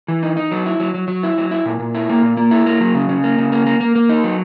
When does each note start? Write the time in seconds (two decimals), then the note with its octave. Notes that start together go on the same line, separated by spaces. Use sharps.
0.08 E3
0.23 D#4
0.37 D#4
0.52 F#3
0.66 E4
0.80 F#3
0.94 F#3
1.08 F#3
1.23 E4
1.38 F#3
1.51 E4
1.66 A#2
1.80 A#2
1.95 E4
2.09 A#3
2.23 A#2
2.37 A#3
2.51 E4
2.66 A#3
2.81 F#3
2.95 C#3
3.09 C#3
3.24 A#3
3.38 C#3
3.52 A#3
3.66 A#3
3.80 A#3
3.96 A#3
4.09 D#4
4.24 F#3